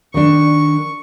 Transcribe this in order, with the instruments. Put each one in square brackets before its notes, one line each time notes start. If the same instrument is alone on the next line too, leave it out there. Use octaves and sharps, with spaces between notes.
[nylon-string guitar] D#3 D4 [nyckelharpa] C#6